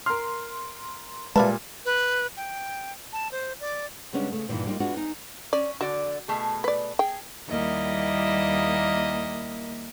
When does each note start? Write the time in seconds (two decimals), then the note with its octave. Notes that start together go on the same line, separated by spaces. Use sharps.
0.06 A#4 C6 F6
1.36 A#2 G3 G#3 F4 B4 E5 A5
1.85 B4
2.37 G5
3.13 A5
3.31 C5
3.60 D5
4.13 C#3 G3 G#3 B3 C#4 D4
4.32 C#3 A3
4.48 G2 A#2 D#3 E3
4.67 G3 A#3 D4 D#4 F4
4.80 G#3 B3 D4 F4 F#4
4.97 D#4 G#5
5.53 C#4 D5
5.81 D3 F#4 D5
6.28 B2 A3 G#4
6.64 B4 D5
6.99 G#4 G5
7.50 D#2 G3 A#3 E4 D#5